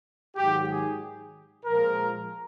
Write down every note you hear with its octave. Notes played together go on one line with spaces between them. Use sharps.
G#2 D#3 F#3 G4
G#4
A#2 F3 G#3 A#4